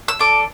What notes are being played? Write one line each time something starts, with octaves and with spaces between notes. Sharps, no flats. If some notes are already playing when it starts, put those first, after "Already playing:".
E6
D4 A4 D6